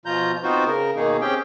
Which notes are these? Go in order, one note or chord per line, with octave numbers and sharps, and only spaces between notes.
B2 F3 F4 A#5 G6
B3 C4 D#4 F4 F#4 C5
C#3 A#4
B2 D#3 A#3 D#4 G#4
C4 C#4 G4 G#4 G5